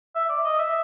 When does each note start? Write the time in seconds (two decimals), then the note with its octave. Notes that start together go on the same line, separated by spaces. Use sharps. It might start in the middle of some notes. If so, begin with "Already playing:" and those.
0.16 E5
0.29 D5
0.44 D#5
0.59 E5